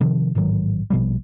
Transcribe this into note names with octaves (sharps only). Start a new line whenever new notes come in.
C3 D#3 F3
A1 G#2 D#3 F#3
A#1 B2 F3 G3